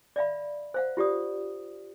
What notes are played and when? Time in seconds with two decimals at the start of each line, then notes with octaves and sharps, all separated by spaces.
0.16 D5 E5 F5 B5
0.74 C5 F5 F#5
0.97 F4 G4 D5 D#6